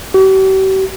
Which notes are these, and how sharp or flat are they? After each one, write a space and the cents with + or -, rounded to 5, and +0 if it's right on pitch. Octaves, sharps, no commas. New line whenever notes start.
G4 -45